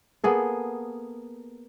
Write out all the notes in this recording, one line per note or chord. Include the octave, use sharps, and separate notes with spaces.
A#3 B3 G#4 A4